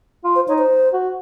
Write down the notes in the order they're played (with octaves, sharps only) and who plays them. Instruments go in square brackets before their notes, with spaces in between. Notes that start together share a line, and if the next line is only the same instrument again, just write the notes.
[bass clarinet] F4
[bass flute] C5
[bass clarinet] D#4 [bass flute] C#5
[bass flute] C5
[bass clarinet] F#4